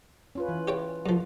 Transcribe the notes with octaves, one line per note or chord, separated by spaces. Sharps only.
C#4 F4 B4
E3
G4 C#5 G5
F#2 F3